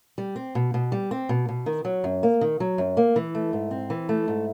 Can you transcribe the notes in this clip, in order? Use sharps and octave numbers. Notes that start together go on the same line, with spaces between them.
G3
C4
B2
B2
G3
C4
B2
B2
D#3
F#3
F#2
A#3
D#3
F#3
F#2
A#3
E3
A3
G#2
C4
E3
A3
G#2